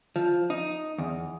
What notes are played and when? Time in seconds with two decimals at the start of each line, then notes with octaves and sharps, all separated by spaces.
0.16 F3
0.50 D#4
0.98 E2